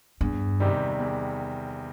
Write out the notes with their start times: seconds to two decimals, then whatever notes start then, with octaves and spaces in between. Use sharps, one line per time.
0.21 E2 G2
0.60 C3 D#3 G3
0.99 E2